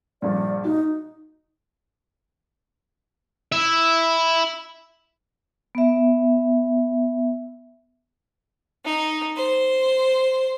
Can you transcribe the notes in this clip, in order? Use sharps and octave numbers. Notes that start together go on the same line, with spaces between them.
A#1 G2 A#2 D5
D#4 F#4
E4 E5
B3 E5
D#4
C5